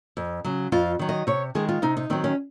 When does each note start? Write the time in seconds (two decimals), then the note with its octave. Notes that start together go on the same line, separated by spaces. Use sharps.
0.17 F2
0.44 C#3 F#3
0.72 F2 F4
0.99 D#3 F#3
1.09 D#5
1.27 C3 C#5
1.55 D#3 G#3 G#4
1.69 F4
1.82 C3 D#4
1.97 D#4
2.10 D#3 F#3 C4
2.24 C#4